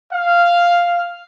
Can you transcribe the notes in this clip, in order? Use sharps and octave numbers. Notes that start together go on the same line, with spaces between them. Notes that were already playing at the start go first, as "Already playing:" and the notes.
F5